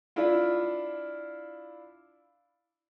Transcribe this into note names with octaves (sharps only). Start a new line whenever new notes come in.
D4 E4 F4